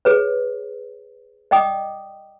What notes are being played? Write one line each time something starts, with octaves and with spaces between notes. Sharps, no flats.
G#4 B4 C#5
D5 D#5 G5 D6 D#6